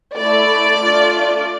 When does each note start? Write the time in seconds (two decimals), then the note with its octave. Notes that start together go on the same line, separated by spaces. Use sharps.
0.17 A3 E4 A4 D5
0.79 A3 D4 F4 A4